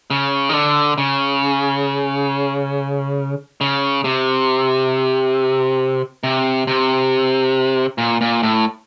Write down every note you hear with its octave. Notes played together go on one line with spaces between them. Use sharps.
C#3
D#3
D3
C#3
C#3
C3
C3
C3
A#2
A#2
A2